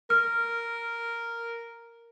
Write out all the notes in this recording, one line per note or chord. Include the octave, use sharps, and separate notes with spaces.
A#4 F6